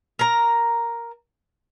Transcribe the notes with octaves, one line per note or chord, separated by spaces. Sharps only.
A#4 A#5